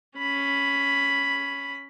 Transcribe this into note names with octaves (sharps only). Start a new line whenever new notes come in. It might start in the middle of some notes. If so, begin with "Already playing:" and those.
C#4 B5